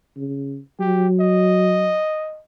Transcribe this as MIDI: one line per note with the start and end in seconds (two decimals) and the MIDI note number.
0.17 0.59 49
0.80 1.98 54
0.80 1.08 67
1.20 2.41 75